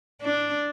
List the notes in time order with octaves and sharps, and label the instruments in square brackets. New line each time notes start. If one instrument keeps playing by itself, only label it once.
[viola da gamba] D4